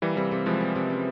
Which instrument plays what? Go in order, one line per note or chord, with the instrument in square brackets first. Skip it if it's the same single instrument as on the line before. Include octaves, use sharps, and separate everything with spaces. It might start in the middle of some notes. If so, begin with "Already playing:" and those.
[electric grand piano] E3 G3 [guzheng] A#3
[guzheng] C3 [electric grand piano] E3 G3
[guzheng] C3
[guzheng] E3 [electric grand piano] F3 G#3
[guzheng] E3
C3
C#4